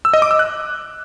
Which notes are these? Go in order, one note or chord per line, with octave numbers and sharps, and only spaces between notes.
E6
D#5
D6
E6
F#6